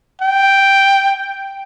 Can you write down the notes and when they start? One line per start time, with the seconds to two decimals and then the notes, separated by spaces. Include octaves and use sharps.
0.22 G5